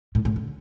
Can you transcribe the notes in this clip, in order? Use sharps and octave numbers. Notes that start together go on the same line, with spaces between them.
A2
A2
D3